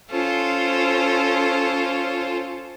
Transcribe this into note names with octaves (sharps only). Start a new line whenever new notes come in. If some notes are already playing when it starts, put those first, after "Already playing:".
C#4 F4 A4 C5